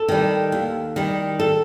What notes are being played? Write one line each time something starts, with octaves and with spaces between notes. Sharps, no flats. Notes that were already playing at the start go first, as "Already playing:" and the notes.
Already playing: A4
D#3 G3
D#2
D#3 G3
A4